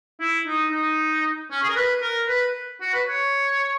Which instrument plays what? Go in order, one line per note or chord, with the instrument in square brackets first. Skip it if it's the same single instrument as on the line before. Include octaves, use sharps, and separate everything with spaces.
[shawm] E4
D#4
D#4
C#4
G#4
A#4
B4
A#4
B4
F#4
B4
C#5